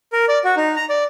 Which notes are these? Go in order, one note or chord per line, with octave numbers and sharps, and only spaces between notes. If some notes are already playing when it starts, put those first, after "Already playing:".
A#4
D5
F#4
D#4
A#5
D5